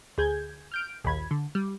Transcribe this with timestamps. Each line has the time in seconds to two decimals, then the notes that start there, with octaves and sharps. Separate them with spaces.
0.18 D2 G#4 G6 G#6
0.72 F6 G6 D7
1.04 A#1 D#2 B5 G#6
1.31 D3
1.55 G3